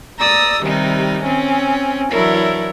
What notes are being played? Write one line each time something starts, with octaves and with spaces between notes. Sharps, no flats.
D5 A#5 D#6 E6
C3 D#3 G3 D#4
C4 C#4
E3 F#3 D4 E4 A#4 C#5